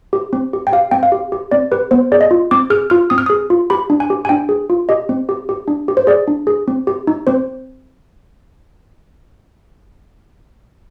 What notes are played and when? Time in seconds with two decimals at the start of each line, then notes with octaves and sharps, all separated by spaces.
0.13 G4
0.33 C4
0.53 G4
0.67 G5
0.72 G4 F5
0.91 C4 G5
1.03 F5
1.12 G4
1.32 G4
1.51 C4 D5
1.72 G4 B4
1.91 B3 C5
2.12 G#4 D5
2.21 D#5
2.31 F4
2.51 C4 D6
2.70 G#4 F6
2.90 F4 F6
3.10 C4 D#6
3.18 F6
3.26 G#4 D#6
3.50 F4
3.70 G4 B5
3.90 D4
4.00 G#5
4.10 G4
4.25 G#5
4.29 D4 G5
4.49 G#4
4.70 F4
4.89 G4 D#5
5.09 C4
5.29 G4
5.49 G4
5.68 D4
5.88 G4
5.97 C5
6.07 G#4 D5
6.28 D4
6.47 G#4
6.68 C4
6.87 G4
7.07 D#4
7.27 C4 C5